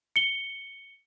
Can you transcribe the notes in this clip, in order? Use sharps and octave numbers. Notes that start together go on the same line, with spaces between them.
C#7 G7